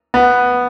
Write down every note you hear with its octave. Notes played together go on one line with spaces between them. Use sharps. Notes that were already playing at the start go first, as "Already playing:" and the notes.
B3